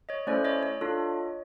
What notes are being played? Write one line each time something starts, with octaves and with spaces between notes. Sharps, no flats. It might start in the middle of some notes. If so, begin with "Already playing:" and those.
C#5 D#5
A3 C#4 E4 A4 C5 D5
C#5 D#5
C#5 D#5
D4 F4 A4